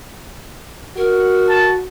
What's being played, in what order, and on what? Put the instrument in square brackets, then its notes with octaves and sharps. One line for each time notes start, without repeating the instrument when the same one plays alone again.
[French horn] F#4 [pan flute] A#4
[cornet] A5